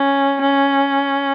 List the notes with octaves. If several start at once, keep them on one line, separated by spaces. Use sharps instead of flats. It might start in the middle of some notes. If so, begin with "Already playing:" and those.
Already playing: C#4
C#4